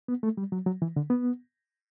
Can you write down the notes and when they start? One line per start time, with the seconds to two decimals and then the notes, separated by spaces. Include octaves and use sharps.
0.08 B3
0.23 A3
0.37 G3
0.52 F#3
0.66 F#3
0.82 E3
0.96 D3
1.10 B3